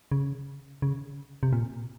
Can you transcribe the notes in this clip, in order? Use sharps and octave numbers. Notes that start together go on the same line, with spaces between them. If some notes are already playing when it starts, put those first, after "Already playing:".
C#3
C#3
C3
A#2